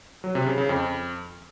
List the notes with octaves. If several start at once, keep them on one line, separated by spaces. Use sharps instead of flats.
F#3
C3
C#3
C#3
F2